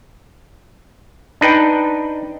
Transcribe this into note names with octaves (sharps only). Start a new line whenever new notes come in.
D4 D#4 B4 G5